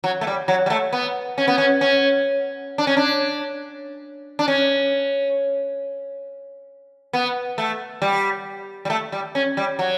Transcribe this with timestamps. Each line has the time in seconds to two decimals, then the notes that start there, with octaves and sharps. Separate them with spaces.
0.04 F#3
0.21 A3
0.27 G3
0.48 F#3
0.66 G3
0.70 A3
0.93 B3
1.38 C#4
1.48 B3
1.58 C#4
1.81 C#4
2.78 D4
2.87 C#4
2.97 D4
4.39 D4
4.48 C#4
7.13 B3
7.58 A3
8.02 G3
8.85 G3
8.90 A3
9.12 G3
9.35 C#4
9.57 G3
9.79 F#3